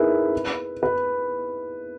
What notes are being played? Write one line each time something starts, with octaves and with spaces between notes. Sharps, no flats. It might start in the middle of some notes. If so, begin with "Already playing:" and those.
Already playing: D#4 E4 G#4 A#4 B4
B4